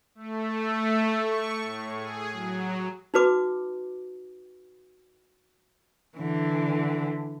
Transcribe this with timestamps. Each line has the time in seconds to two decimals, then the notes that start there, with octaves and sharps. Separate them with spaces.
0.15 A3
1.20 C#6
1.61 A2
1.96 G#4
2.32 F#3
3.14 D#4 F#4 B4 D6
6.17 D3 E3